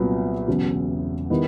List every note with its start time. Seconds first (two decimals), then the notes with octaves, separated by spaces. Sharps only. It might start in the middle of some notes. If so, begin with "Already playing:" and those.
Already playing: C2 A#2 F#3 B3
0.48 E1 E2 C#3 F#3
1.30 D#3 G3 B3 E4